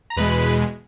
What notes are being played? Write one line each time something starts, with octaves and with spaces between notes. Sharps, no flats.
A#5
E2 B2 G#3 B4 B5